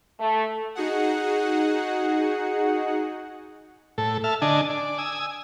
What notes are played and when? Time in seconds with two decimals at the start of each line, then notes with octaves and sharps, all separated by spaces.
0.20 A3
0.75 D#4 F#4 G#4 F#5
3.98 A2 A4
4.24 E5 A5 F6
4.42 D3 D4 D#5 G#5 A5
4.70 D5
4.98 G#5 D#6 E6